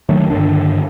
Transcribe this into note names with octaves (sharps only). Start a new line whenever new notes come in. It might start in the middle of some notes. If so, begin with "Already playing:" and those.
D#3 F#3 A3 D4
G2 D3 D#3 D4